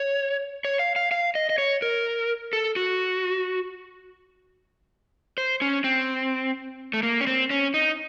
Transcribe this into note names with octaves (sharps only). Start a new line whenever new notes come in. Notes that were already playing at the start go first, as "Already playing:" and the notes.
Already playing: C#5
C#5
F5
F5
F5
D#5
D#5
C#5
A#4
A4
F#4
C5
C#4
C4
A3
A#3
C#4
C4
C#4
D#4